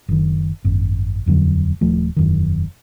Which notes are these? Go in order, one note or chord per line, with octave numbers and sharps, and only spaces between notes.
F#1 D#3
G#1 F#2
D#1 F2 D3 F#3
D#1 F3 A3
E1 F#2 D#3